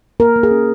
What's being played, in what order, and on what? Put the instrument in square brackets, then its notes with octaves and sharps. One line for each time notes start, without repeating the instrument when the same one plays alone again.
[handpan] A#3 A#4
A#3
G#4
C#4